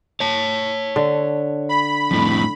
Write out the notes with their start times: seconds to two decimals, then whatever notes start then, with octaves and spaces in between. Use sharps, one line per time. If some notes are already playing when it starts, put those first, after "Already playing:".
0.20 C#5 A5
0.96 D3
1.69 B5
2.11 F2 A2